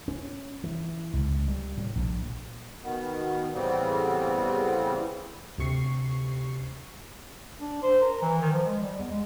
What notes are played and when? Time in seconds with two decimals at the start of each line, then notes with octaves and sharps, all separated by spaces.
0.08 C#4
0.64 E3
1.13 C#2
1.48 G3
1.78 A2
1.96 A#1
2.84 B2 D#3 B3
3.54 A2 C#3 E3 G3 B3 C4
5.58 D2 C3 C#6 C7
7.60 D4
7.82 C5
8.01 A#4
8.22 E3
8.41 D#3
8.52 F3
8.66 G#3
8.83 G3
8.99 E2
9.10 G#3